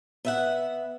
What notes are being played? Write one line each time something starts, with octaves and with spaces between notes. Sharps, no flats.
B3 E5 F#5